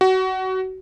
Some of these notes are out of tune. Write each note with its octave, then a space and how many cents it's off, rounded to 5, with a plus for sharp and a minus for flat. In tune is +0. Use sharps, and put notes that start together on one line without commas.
F#4 +25